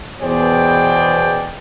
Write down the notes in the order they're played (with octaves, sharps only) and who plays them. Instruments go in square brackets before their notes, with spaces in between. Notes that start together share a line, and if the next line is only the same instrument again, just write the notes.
[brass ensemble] E2 B2 G#4 C5 D5 G5